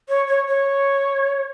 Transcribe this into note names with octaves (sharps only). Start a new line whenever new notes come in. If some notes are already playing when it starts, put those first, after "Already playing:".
C#5
C#5
C#5